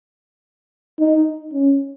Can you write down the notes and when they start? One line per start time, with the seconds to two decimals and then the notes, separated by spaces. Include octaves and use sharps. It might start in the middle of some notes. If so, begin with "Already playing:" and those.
0.99 D#4
1.53 C#4